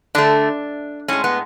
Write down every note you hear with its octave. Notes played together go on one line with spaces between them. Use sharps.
D3 A3 D4
A2 G#3 C#4
B3